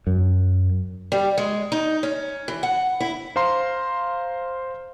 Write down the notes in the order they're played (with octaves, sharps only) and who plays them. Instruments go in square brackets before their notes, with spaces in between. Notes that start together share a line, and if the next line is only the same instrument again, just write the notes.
[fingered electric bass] F#2
[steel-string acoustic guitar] G3
G#3
D#4
C#4
E3
F#5
E4
[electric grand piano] C5 F5 A#5 C6